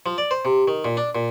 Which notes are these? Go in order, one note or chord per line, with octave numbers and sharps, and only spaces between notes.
F3
D5
C5
C3
D#3
A#2
D4
A#2